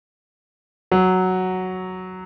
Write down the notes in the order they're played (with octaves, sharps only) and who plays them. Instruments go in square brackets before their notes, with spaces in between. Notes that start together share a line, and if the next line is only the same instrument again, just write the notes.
[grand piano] F#3